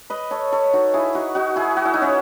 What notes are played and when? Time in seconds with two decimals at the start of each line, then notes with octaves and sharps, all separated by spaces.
0.10 B4 D#5
0.31 A4 C#5
0.52 A4 C#5
0.74 D#4 F#4
0.94 E4 G#4
1.15 D#4 F#4
1.35 D#4 F#4
1.56 E4 G#4
1.77 F#4
1.85 E4
1.94 D#4
2.02 C#4 E4